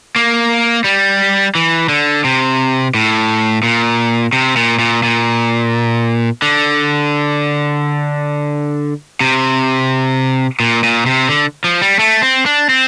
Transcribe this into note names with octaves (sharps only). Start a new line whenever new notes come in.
A#3
G3
E3
D3
C3
A2
A#2
C3
A#2
A#2
A#2
D3
C3
A#2
A#2
C3
D3
F3
G3
A3
C4
D4
C4